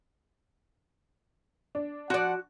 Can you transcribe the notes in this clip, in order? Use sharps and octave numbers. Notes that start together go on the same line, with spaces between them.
D4
F3 F#4 D5 F#5